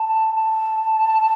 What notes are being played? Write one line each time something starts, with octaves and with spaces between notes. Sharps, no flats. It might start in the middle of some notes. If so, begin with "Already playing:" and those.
Already playing: A5
A5